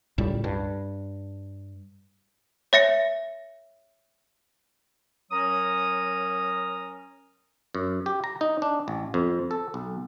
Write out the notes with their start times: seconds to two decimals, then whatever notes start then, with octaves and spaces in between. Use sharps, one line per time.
0.18 C#2 A2 G3
0.44 G2
2.73 C#5 E5 A#6 C#7
5.31 F#3 C#4 A#4 A#5 D#6
7.75 F#2
8.06 G4
8.24 A#5
8.41 D#4
8.62 D4
8.88 A1
9.14 F2
9.51 A4
9.74 B1